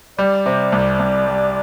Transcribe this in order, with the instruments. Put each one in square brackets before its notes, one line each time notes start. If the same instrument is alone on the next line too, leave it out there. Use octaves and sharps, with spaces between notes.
[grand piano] G3 [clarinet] D5
[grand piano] C3
C2
C2
G3